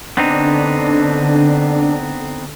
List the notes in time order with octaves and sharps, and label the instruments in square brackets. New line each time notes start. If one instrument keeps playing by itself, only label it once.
[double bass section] D3 [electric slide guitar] B3 C4 D#4 [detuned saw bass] D4